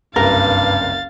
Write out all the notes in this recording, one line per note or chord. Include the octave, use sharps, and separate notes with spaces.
F#1 C2 G2 A#4 B4 F5 A6